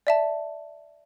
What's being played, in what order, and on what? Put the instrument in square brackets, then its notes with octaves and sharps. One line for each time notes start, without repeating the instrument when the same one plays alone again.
[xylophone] D5 E5 A5